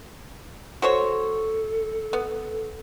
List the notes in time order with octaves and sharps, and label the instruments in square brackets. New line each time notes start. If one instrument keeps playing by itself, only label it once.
[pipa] F#4 C5 C#5 [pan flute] A4
[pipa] B3